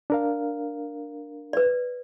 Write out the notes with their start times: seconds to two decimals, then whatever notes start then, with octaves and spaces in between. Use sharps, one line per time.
0.10 D4 A#4 F5
1.53 B4 D5